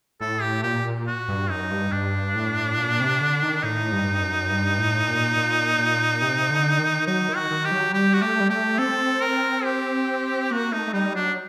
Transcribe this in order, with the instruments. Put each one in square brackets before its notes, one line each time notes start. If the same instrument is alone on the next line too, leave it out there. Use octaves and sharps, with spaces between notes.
[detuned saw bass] A2 [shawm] A4
[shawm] G4
[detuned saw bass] A#2 [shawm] G4
[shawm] F#4
[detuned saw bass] G2
[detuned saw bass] F#2 [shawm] D#4
[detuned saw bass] G2
[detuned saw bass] G2 [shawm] D4
[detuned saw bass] A2
A#2
C3
D3
D#3
[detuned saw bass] A2 [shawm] D#4
[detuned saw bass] G2
F#2
G2
A2
A#2
A#2
A#2
C3
D3
D#3
[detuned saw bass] F#3 [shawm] D#4
[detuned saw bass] D#3
[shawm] F#4
[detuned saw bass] D#3
[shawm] G4
[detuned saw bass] F#3
[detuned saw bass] G3 [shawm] G4
[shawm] F#4
[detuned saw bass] A3 [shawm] G4
[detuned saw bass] G3
[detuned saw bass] A3 [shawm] G4
[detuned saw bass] C4 [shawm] A4
[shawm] A#4
G4
[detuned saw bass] A#3 [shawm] F#4
[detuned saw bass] A3 [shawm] D#4
[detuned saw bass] A3
[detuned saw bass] G3 [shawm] D#4
[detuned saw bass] F#3 [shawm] D4